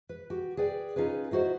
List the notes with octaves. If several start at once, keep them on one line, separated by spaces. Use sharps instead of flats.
B4
F#4 G4
G#4 B4 D5 G5
C#4 D#4 F4 G#4 B4
D#4 E4 F#4 C5 D#5